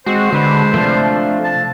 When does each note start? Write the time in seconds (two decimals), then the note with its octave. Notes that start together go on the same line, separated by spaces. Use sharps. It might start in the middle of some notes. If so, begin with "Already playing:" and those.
0.06 G#3 C4 F#4 C5
0.33 D3 G#3 B4
0.74 C3 F3 A3 D4
1.44 A5